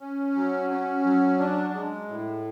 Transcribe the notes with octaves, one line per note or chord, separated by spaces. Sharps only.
C#4
F#3
C#4
F#3
D4
G#3
A2